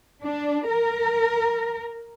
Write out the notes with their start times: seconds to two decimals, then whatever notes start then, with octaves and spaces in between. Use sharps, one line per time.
0.23 D4
0.68 A#4